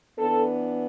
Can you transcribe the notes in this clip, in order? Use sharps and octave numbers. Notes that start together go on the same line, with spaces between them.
E3 B3 D4 A4